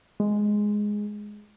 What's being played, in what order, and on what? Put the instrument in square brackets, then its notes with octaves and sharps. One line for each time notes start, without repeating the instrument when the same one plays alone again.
[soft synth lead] G#3